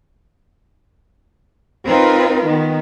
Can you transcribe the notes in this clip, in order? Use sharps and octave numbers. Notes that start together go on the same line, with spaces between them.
C4 D#4 F4 A#4 B4
D#3 B3